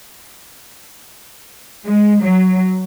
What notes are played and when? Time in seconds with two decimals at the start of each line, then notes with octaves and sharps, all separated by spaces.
1.86 G#3
2.23 F#3